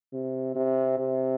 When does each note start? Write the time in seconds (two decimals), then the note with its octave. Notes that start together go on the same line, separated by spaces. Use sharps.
0.12 C3
0.55 C3
0.98 C3